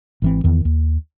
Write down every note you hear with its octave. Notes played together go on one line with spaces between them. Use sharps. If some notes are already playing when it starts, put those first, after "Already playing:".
G#1 E3 C4
E2 D#3
D#2